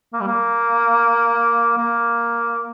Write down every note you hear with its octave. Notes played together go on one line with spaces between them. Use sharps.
A#3
G3
A#3
A#3